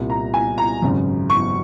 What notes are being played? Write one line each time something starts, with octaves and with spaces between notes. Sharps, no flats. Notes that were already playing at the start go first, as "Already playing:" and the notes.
Already playing: C2 A#2
A#5
G#5
A#5
G#1 F#2 C#3
C#6